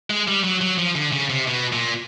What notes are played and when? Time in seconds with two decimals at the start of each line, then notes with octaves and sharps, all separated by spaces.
0.10 G#3
0.28 G3
0.44 F#3
0.61 F#3
0.78 F3
0.95 D3
1.13 C#3
1.30 C3
1.48 B2
1.73 A#2